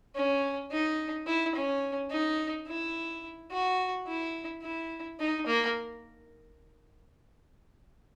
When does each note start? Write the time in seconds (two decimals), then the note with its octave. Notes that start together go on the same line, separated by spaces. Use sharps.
0.16 C#4
0.71 D#4
1.27 E4
1.55 C#4
2.10 D#4
2.67 E4
3.51 F#4
4.07 E4
4.63 E4
5.20 D#4
5.47 A#3